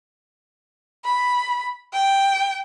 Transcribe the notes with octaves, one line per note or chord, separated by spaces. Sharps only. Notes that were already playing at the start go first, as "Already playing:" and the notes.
B5
G5